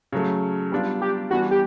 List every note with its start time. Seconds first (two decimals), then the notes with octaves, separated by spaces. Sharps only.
0.13 C#3 F#3 A3
0.72 G3 B3 D4 F4
1.01 G4
1.31 E3 G3 B3 D4 F#4
1.51 G4